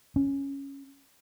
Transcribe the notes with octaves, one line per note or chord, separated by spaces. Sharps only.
C#4